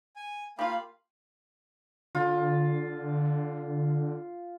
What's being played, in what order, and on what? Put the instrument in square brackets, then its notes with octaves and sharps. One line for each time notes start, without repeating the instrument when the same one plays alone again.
[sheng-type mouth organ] G#5
[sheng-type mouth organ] A#3 F5 B5 [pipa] F4 G4
[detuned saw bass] D3 [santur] F4